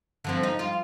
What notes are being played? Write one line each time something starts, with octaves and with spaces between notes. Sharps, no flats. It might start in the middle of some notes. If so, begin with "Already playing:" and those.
D3 F3 C4
D#4
F4